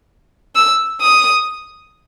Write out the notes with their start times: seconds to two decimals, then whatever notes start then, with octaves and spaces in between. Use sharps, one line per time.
0.55 E6
1.01 D#6